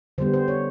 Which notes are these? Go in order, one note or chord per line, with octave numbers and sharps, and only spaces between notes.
D3 G3 B3 C5
C5
C#5